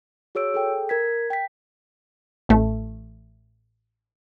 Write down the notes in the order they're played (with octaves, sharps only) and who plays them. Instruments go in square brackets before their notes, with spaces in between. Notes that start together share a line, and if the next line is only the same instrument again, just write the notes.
[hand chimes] F#4 G#4 C#5 E6 D7
G#4 A4 G5
A#4 G#6 B6
G5 B6
[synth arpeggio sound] A1 A3